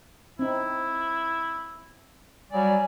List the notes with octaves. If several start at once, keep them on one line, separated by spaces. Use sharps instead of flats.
C4 D#4 E4
F#3 G3 D5 G#5